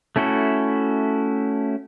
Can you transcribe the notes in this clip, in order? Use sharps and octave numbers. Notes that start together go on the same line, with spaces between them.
A3 C#4 E4 F#4 A4